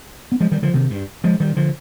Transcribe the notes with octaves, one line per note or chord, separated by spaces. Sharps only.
B3
F3 G#3
D#3 G3
D3 F3
C3 D#3
G2
F3 G#3
D#3 G3
D3 F3